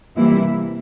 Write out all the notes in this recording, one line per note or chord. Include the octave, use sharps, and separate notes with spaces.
C3 E3 G3 A#3 E4